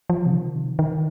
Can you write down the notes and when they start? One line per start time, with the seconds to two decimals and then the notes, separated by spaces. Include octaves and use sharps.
0.10 F3
0.26 C3
0.32 D#3
0.55 C3
0.79 D#3